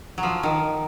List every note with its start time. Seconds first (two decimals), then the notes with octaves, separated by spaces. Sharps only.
0.18 F#3
0.23 F3
0.43 D#3